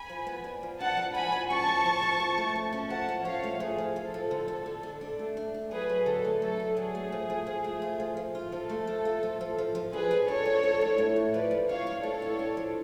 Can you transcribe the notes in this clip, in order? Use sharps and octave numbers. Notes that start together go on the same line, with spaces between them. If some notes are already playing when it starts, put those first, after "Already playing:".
Already playing: G#5 B5
F3
B3
D4
F3
D4 F#5 A5
F3
D4 G#5 B5
F3
C#4 A5 C#6
F3
F3
F3
F3
A3
C#4
C#4
F3 F#5 A5
C#4
F3 C#5 F5
A3
F3 G#4
F3
F3 A4
F3
D3
D3
D3
D4
D4
A3
D4
D4
F#3 G#4 B4
F#3
D3 A4
A3
F#3 A4
D4
F#3 G#4
A3
F3
F3
F3
A3
F4
F3
F3
F4
F3 A4
A3
A3
F4
F3
F3
F3
F3
D4 G#4 B4
D4
D4 A4 C#5
F3
D4
A2
A3
A2
F3 B4 D5
F3
D4 C#5 F5
D4
A2 A4 C#5
D4
D4
F3